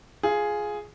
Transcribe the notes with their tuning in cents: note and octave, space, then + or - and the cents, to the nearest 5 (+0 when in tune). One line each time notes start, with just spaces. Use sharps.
F4 +0 G#4 +5